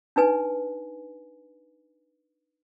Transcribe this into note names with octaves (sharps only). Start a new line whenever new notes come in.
D4 D#4 B4 G#5